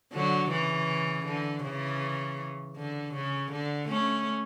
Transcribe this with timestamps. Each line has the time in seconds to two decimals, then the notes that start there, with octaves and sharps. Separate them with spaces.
0.13 D3 F#3
0.50 C#3 E3
1.25 D3
1.63 C#3 E3
2.76 D3
3.14 C#3
3.52 D3
3.88 A3 C#4